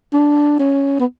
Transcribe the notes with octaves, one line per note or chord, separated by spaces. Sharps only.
D4
C#4
B3